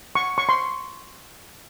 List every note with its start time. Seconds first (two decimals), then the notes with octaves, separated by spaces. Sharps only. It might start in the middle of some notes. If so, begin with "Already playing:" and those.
0.15 C#6
0.38 C#6
0.49 C6